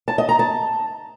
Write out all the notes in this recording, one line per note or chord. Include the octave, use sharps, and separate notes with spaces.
A5
D#5
A#5
A5